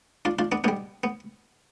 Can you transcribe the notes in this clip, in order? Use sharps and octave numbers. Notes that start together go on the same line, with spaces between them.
D4 F4
D4 F4
B3 D4
B2 G3 B3 D4
B3